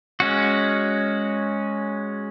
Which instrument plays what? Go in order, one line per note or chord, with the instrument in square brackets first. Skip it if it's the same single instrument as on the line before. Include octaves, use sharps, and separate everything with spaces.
[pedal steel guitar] G#3 C#4 F#4